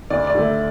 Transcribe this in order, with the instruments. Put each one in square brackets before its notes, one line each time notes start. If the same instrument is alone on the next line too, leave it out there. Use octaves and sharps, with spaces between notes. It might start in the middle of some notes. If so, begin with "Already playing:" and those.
[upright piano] D2 D5
D5
D3 A3